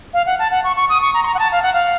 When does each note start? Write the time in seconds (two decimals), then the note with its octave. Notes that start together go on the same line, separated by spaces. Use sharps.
0.14 F5
0.26 F#5
0.39 A5
0.51 F#5
0.64 C#6
0.76 C#6
0.89 D#6
1.02 C#6
1.14 A#5
1.23 C6
1.27 A#5
1.34 F#5
1.39 A5
1.52 F5
1.62 F#5
1.74 F5